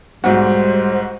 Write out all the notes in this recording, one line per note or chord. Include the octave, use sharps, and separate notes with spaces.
B1 G#2 G3 F#4 C5